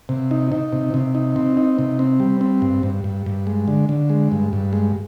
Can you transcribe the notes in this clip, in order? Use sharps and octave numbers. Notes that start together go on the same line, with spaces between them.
C3
D#4
D#4
C3
C3
D#4
C4
D#4
C3
C4
G3
C4
G2
G2
G2
G2
G#3
D3
D3
G#3
G2
G2
G#3